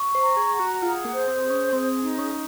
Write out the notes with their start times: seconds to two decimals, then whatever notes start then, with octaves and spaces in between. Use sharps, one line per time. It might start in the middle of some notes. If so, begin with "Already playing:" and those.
Already playing: C#6
0.15 C5
0.23 A#5
0.37 G#4
0.52 F#5
0.60 F#4
0.82 F4 G#4
1.05 A#3
1.13 C5
1.27 C4
1.43 G#4
1.50 C#4
1.73 C4 G#4
2.03 D#4
2.18 C#4